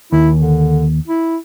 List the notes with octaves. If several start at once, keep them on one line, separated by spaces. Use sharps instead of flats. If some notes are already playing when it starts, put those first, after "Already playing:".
D#2 E4
D3
E4